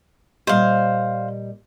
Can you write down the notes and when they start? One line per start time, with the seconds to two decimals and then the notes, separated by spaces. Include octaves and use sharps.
0.47 A#2 G3 C5 D#5 F5